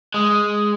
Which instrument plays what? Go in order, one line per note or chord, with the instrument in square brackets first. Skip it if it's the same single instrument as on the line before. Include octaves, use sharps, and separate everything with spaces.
[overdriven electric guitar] G#3